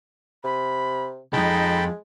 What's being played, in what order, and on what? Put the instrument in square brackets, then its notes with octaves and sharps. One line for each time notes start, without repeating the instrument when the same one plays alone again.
[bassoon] C3 [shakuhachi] B5
[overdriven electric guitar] C2 F2 [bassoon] G#3 [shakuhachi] D#4 [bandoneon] G5 A5 B5